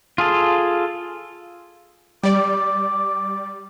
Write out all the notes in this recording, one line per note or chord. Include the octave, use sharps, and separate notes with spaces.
F4 G#4 A4
G3 D5 D6